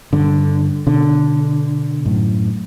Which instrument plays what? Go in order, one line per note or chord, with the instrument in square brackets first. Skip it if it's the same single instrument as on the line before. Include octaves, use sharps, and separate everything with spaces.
[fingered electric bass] G2 [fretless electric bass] D3
[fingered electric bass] B2 [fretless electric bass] D3
[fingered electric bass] F#2 A2